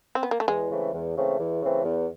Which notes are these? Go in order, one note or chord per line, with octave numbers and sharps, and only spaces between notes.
C4
B3
A#3
A3
E2 G#3
C#3 E3 A3 C4
E2
C#3 E3 A3 C4
E2
C#3 E3 A3 C4
E2